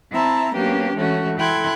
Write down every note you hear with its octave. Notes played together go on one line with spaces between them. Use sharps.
C4 E4 E5 A5 A#5
F#3 A#3 B3 C#4 D4 G4
E3 G#3 A3 C#4 F#4
E4 A4 G5 C6 F#6 G#6